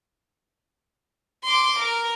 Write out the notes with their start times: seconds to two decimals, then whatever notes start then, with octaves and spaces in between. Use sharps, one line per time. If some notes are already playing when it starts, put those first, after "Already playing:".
1.44 C6 D6
1.79 A#4